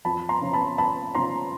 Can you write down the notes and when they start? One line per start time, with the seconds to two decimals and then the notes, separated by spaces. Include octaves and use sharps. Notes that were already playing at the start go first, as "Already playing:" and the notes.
0.05 F2 A5 B5
0.29 A#5 C6
0.41 C#3 F3
0.53 A5 B5
0.78 F2 A5 B5
1.15 C#3 F3 A#5 C6